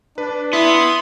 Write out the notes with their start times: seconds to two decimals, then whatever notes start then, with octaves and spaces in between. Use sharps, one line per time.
0.18 D4 B4
0.53 B3 E4 E5 C6 D#6